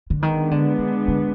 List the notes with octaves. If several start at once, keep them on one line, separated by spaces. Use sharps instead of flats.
D3
D#3 G#3 B3 D4
D3
D3
D3